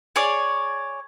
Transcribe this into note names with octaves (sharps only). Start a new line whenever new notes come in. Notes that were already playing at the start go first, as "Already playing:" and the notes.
G#4 C#5 D5